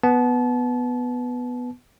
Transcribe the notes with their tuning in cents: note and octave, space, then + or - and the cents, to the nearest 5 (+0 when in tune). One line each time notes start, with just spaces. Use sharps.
B3 +0 A5 -30